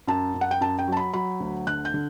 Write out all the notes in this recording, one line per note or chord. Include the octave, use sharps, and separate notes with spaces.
F#2 A5
F#2
F#5
G5
F#2 A5
G5
F#3 A5
B5
F#3 B5
D2
D3 F#6
G6
D3